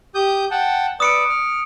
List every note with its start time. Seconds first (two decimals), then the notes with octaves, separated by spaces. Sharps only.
0.15 G4 D#6 G6
0.51 F#5 G5 A5
1.00 B4 D5 D#6 E6 C#7 D7
1.29 F6